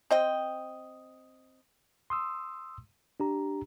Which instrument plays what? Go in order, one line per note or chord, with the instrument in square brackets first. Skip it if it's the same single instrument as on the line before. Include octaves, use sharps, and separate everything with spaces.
[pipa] C4 D#5 G5
[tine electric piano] C6 D#6 E6
D4 G4 A#5